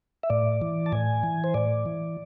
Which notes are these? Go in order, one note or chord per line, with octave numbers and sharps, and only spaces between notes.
E5
A2 D5
E3
A5
A2 G#5
E3
C5
A2 D5
E3